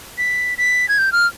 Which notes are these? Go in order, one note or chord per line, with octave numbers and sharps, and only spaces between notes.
B6
B6
G#6
G6
F6